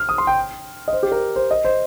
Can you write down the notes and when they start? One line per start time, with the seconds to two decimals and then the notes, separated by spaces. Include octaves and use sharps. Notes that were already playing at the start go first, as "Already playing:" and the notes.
Already playing: F6
0.09 D#6
0.18 C6
0.27 G5
0.88 D#5
0.93 C5
1.03 G4
1.12 A#4
1.36 C5
1.51 D#5
1.65 C5